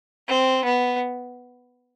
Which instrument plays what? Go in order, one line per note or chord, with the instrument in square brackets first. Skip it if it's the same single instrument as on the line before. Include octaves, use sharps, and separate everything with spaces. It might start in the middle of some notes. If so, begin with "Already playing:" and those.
[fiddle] C4
B3